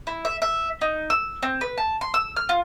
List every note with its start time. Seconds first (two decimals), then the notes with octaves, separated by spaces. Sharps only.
0.07 E4
0.25 E5
0.42 E5
0.81 D#4
1.10 E6
1.43 C4
1.61 B4
1.78 A5
2.01 C6
2.14 E6
2.36 F6
2.49 F4